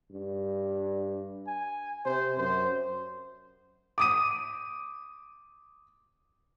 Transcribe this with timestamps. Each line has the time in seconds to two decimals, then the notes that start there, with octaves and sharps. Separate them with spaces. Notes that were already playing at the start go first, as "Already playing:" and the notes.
0.12 G2
1.47 G#5
2.05 C3 C5
2.37 F#2 C5
3.98 D6 D#6 D#7